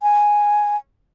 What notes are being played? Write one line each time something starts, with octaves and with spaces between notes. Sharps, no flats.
G#5